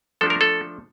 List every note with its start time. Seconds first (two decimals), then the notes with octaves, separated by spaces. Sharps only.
0.21 F3 A3 D4 A4
0.30 A#4
0.41 A4